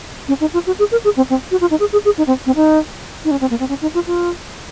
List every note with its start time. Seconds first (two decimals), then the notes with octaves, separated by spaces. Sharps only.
0.28 C#4
0.41 D#4
0.53 F4
0.67 F#4
0.79 G#4
0.92 A#4
1.04 G#4
1.17 C4
1.30 C4
1.51 F#4
1.61 F4
1.71 D#4
1.80 G#4
1.92 G#4
2.05 G#4
2.18 D#4
2.27 C4
2.46 C4
2.56 D#4
3.25 D#4
3.31 C#4
3.41 C4
3.50 A#3
3.60 C4
3.69 C#4
3.82 D#4
3.94 F4
4.07 F4